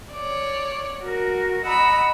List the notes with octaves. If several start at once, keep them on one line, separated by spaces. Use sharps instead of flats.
C#5 D5
F#4 A#4
D#5 F#5 A#5 B5 E6